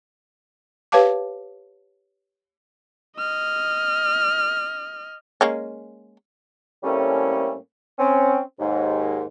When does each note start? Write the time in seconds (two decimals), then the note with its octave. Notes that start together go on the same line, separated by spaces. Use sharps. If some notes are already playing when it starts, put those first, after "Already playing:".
0.92 G4 B4 C#5 F5 A5 D6
3.18 D#5 F6
5.41 G#3 A#3 C#4
6.84 A2 G3 A3 A#3 C4 C#4
7.99 C4 C#4
8.59 D#2 G#2